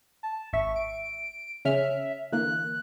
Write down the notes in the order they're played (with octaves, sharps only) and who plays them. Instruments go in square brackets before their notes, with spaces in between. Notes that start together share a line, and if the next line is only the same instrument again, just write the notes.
[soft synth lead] A5
[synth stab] G#1 E5 [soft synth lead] C#6
[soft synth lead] D7
[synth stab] C#3 C#4 F6 [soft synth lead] E5
[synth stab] D3 E3 A#3 [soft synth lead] F#6